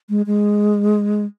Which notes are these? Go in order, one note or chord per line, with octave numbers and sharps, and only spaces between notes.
G#3
G#3